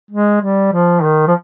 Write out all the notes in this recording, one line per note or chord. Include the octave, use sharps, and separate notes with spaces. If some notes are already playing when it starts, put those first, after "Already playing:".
G#3
G3
F3
D#3
F3